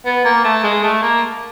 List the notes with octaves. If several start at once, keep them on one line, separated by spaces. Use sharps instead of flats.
B3
A#3
A3
G#3
A3
A#3